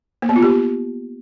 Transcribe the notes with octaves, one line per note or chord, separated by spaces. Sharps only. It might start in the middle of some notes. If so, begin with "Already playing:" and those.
A#3
B3
F4
G4